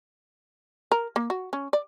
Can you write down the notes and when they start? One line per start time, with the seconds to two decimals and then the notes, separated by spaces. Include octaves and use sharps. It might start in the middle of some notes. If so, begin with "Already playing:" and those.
0.92 A#4
1.16 A#3
1.30 F#4
1.53 C#4
1.73 D5